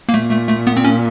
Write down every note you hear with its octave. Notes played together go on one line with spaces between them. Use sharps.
A#3
A#2 A3
A3
A3
B3
C4
C#4